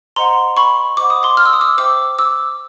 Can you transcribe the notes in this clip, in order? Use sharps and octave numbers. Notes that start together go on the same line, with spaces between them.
C5 D#5 F#5 A#5 C6
B5 C#6
C5 D#5 F#5 D6
D#6
C6 D6
F6
E6
D#6
D6 E6
C5 E5 G5 D6 E6
D6 E6